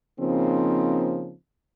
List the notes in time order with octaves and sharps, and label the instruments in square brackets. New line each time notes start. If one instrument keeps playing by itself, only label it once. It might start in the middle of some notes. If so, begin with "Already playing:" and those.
[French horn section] C#3 F3 A#3 C4 D#4